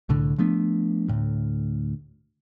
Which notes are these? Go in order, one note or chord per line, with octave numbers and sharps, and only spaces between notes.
C2 A2 D3
F3 A3 B3 D4
D2 A2